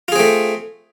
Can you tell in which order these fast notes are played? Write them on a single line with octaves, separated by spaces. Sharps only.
F4 G#4 C4 A3